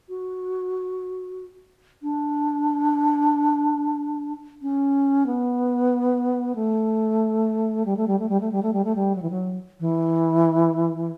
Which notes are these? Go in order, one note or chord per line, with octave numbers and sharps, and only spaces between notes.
F#4
D4
C#4
B3
A3
G3
A3
G3
A3
G3
A3
G3
A3
G3
A3
G3
F#3
E3
F#3
E3